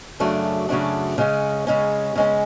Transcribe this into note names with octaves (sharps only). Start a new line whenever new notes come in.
F#2 C#3 F#3 A3 D4
F#2 C#3 F#3 A3 D4
C#3 G#3 C#4
C#3 G#3 C#4
C#3 G#3 C#4